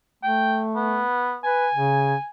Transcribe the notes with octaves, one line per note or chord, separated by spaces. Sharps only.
A3 G5
B3
B4 G#5
C#3